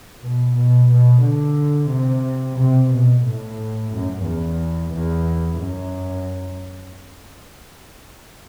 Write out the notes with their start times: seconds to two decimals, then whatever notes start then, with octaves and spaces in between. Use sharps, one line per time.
0.21 B2
0.54 B2
0.88 B2
1.21 D3
1.89 C3
2.56 C3
2.89 B2
3.23 A2
3.91 F#2
4.24 E2
4.91 E2
5.59 F#2